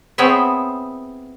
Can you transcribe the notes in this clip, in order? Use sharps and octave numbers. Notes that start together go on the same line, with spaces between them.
B3 C4 E4 G#4 C#5 E5